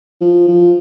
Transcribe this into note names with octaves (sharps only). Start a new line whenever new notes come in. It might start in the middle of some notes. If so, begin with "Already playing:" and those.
F3
F3